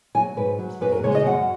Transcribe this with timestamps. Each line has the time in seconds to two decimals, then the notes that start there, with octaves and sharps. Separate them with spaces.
0.15 F#3 G#5
0.37 G#2 B4
0.59 F#3
0.81 F#2 B4
0.92 A#4
1.03 C#3 G#3 C#5
1.15 D#5
1.26 F#2 F#5